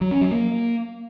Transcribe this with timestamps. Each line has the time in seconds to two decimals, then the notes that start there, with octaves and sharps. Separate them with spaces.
0.01 F#3
0.11 C#4
0.21 F#3
0.31 A#3